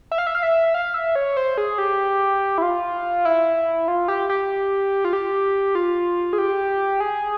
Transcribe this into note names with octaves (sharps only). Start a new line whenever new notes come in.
E5
F5
E5
F5
E5
F5
E5
C#5
C5
G#4
G4
E4
F4
E4
F4
G4
G4
F4
G4
F4
G#4
G4
G#4